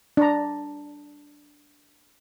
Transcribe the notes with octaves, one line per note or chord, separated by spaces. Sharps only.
D4 A#5